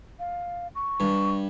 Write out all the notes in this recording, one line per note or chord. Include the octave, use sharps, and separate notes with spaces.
F5
C#6
G2